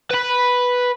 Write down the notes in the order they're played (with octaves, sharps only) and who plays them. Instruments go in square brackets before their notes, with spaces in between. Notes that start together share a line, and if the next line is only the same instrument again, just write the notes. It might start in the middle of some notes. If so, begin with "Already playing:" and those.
[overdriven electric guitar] B4 B5